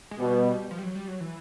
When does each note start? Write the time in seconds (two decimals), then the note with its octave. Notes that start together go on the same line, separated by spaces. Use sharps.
0.11 G#3
0.19 B2 G3
0.71 F3
0.79 G3
0.83 F#3
0.95 G3
1.08 F#3
1.21 E3